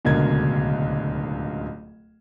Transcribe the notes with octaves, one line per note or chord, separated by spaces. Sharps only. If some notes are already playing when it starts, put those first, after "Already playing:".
D1 C#2 B2 D3 A#4 G#6